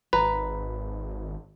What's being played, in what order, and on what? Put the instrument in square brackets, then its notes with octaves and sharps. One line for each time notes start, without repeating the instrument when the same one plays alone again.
[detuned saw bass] G#1 [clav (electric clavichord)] B4 [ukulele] A#5